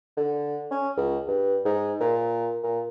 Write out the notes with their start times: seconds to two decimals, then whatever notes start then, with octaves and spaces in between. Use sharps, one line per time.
0.17 D3
0.71 C#4
0.97 C#2
1.27 G2
1.65 G#2
2.00 A#2
2.63 A#2